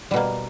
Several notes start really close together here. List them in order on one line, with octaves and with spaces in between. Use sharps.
G3 B2 A#3